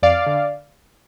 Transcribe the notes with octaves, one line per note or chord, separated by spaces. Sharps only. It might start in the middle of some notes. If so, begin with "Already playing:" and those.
F2 D5 F5
D3